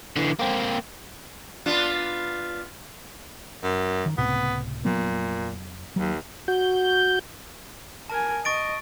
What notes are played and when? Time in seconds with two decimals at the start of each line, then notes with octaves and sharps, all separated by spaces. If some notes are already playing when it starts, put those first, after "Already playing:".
0.16 D3 E3
0.39 A#3 C4
1.66 B3 D4 F4
3.63 F#2
4.06 D#3
4.17 C#2 A2 C3 B3
4.85 F1 A#2 F#3 B3
5.96 D#2 F#3
6.48 F#4 G6
8.10 A#4 G#5 A5
8.45 D#5 C#6 A6 D7